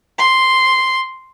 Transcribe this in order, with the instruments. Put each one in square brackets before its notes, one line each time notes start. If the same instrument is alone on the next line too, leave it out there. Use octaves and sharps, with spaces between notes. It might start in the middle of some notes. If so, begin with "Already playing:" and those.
[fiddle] C6